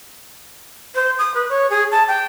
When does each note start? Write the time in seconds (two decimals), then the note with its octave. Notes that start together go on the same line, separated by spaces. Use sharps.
0.95 C5
1.18 D#6
1.35 B4
1.49 C#5
1.70 G#4
1.91 A5
2.08 G5